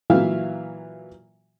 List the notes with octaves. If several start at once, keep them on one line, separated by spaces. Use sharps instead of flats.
A#2 E3 F#3 E5 F5 F6